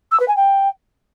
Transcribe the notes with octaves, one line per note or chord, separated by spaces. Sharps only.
E6
B4
G#5
G5